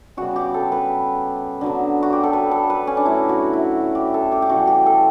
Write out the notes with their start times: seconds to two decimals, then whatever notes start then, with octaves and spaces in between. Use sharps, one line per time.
0.17 C#3 G3 B3 F#4
0.36 G4
0.54 A4
0.72 B4
1.61 D3 F#3 B3
2.03 F#4
2.13 G4
2.23 A4
2.33 B4
2.51 A4
2.70 B4
2.87 C#4
2.97 D4
3.05 A2 F#3 A3 E4
3.29 F#4
3.53 E4
3.77 F#4
3.95 G4
4.14 A4
4.32 G4
4.42 G4
4.49 C#3 E3 G3 B3 F#4
4.67 G4
4.86 A4